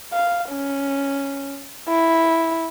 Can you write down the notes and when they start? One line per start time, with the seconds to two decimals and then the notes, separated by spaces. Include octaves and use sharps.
0.13 F5
0.50 C#4
1.89 E4